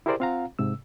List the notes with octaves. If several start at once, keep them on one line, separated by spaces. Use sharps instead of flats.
E4 G4 G#4 A#4 C5 D5
C4 F4 F5 F#5 A#5
G#2 C3 E6